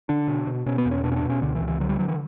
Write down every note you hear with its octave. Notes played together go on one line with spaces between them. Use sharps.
D3 D4
B2
B2
B2 C#4
B3
E2
C#4
B2 D4
C#4
D4
B2
C#4
C#2 D3
E3
C#2
E3
D3 F#3
G3
D3 F#3
E3